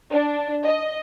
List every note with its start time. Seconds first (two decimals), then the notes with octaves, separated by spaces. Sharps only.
0.11 D4
0.65 D#5